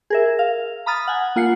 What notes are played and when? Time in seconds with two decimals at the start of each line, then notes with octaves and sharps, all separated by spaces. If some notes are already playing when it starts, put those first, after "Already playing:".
0.10 G#4 A#4 E5
0.39 F5
0.86 A#5 B5 D#6 F6 A6
1.08 F#5 G#5
1.36 A#3 F4 F#5 C7 C#7